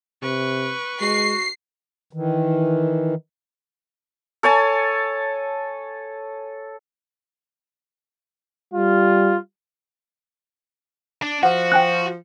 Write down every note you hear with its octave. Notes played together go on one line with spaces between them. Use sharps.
C3 B4 C#6
G#3 F#4 C7
D#3 E3
A4 C#5 G#5 A5
G3 F4
D4
F3 F#4 F#5
G5 G#5 F#6